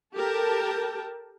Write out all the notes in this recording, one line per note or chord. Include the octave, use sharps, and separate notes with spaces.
G4 A4 A#4 G5 A5